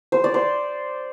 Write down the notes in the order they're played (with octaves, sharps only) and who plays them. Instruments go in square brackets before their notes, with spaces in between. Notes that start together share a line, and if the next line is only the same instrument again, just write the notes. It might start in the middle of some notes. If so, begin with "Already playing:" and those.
[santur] C5
D5
C5